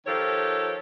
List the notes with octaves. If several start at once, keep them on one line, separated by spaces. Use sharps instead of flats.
D#3 F3 G4 A4 C#5